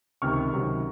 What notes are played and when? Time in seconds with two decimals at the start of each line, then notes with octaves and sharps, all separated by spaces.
0.22 C#2 C3 D#3 C#6 F6
0.53 C#2 C3 D#3 F#3